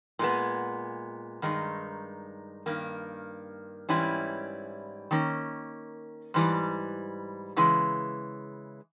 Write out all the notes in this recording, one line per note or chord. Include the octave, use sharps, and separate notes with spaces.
A#2 G#3 B3
G2 D#3 G#3 D#4
G2 D#3 A#3
G#2 E3 G3 C#4 E4
D#3 A#3 C#4
G#2 E3 G3
C#3 E3 G#3